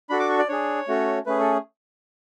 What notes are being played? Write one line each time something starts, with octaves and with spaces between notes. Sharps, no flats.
D4 F#4 A4 B5
D6
C#6
D5
D4 G#4 C#5
A3 C#4 F#4 A4
A3 C#4 G#4 B4
A4